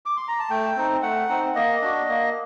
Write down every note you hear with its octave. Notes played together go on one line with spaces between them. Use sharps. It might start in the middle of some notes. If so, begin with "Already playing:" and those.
D6
C6
A#5
A5
A3 G5
C4 D#4
A3 F#5
C4 D#4
A#3 D#5
D4 F#4
A#3